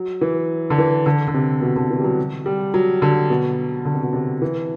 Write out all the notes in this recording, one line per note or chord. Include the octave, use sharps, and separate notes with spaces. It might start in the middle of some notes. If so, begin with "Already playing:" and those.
Already playing: F#3
E3
D3
E3
D3
D3
C3
B2
D3
E3
G3
F#3
G3
F#3
D3
B2
D3
C3
B2
C3
E3